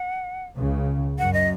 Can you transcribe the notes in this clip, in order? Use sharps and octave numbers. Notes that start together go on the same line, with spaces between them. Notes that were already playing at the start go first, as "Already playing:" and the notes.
Already playing: F#5
C#2 C#3
F#2 F#5
D#5